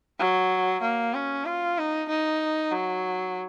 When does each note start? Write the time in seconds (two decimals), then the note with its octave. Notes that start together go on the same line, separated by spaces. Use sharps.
0.19 F#3
0.82 A#3
1.14 C#4
1.45 F4
1.78 D#4
2.09 D#4
2.72 F#3